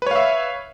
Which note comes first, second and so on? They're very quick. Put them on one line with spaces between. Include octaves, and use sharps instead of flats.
B4 C#5 F5 E5